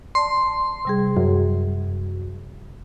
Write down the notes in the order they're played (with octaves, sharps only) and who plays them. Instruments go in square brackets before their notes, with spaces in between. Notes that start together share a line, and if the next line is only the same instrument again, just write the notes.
[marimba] D5 A5 [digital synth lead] C6
[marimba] C3 G3 G#4
[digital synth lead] F#2